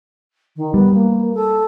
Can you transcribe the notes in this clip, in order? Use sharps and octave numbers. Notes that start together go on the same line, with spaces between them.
D#3
G3 B3
A#3
A4